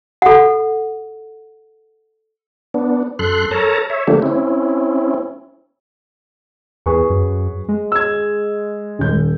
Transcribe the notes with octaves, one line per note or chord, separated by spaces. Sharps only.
A4 F#5
B3 D4
F#2 A4 C6 F#6
A4 A#4 C#5 A5 A#5
C#5 E5
D3 F3 A3 A#3 D4 G4
C4 C#4 E4
E2 G#4 B4 C#6
F#2
G#3
E6 G#6
D#1 G6